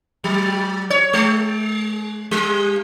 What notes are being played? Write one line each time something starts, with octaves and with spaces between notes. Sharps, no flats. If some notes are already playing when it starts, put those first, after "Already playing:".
F#3
C#5
G#3
G3